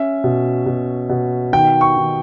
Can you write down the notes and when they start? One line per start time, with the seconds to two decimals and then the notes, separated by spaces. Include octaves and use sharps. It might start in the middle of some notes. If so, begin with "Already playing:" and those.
Already playing: C#4 E5
0.24 B2
0.66 B2
1.09 B2
1.53 D#3 G5
1.81 C#6
1.96 D#3